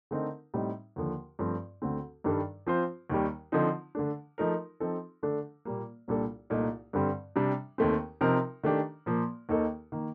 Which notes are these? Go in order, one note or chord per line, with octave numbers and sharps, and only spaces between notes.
D3 A3 C4 D#4 A#4
A2 G3 C4 D#4
D#2 D3 F3
G2 F3 A3 C4
D2 D3 A3 C4
G2 D#3 G3 D4 A4
F3 C4 F4 C5
D#2 D#3 G3
D3 F3 C4 D#4
D3 A3 D4
F3 A3 D#4 A#4
F3 C4 D#4 A4
D3 A3 D4 A4
A#2 G3 A#3
C2 A#2 G3 D4 A4
C2 A#2 A3 D#4
G2 D3 G3 C4
C3 G3 D4
D#2 D#3 A3 C4
C3 F3 C4 D#4 A#4
D#3 A3 D4 G4
A#2 F3 A#3
D#2 D#3 A#3 D#4 A4
D#3 A#3